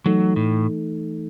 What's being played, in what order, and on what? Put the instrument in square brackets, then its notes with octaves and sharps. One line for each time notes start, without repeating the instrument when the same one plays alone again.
[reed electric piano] E3 A3 D#4 A4 [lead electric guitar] F#3
[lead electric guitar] A2